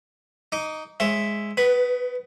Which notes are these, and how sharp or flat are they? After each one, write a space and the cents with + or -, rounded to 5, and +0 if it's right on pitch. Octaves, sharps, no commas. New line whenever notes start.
D#4 +0 D6 -35
G#3 +0 C#5 -40 E5 +0
B3 +30 B4 +0